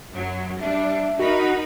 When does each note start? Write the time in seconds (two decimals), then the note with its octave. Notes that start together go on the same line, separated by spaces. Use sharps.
0.12 F#2 F#3
0.60 G3 D4 E5
1.19 D#4 F#4 A#4 B5